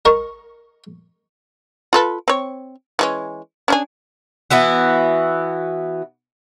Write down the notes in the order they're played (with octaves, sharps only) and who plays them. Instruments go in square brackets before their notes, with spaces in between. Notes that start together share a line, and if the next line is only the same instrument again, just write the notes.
[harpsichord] A#4 D#5 A#5 C#6
[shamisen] F4 A4 B4
C4 C#5
E3 G#3 C#4
C#4 D4 G#4
[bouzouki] E3 B3 E4 F#4